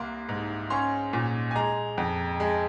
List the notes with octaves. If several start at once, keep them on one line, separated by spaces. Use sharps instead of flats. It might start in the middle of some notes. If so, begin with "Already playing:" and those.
Already playing: C2 A#3 C6
G#2
C#4 C6
A#2
G#5
G#3 A#5
F2
G#3